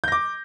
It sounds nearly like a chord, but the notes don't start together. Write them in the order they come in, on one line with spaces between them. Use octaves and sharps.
G6 A#6 D6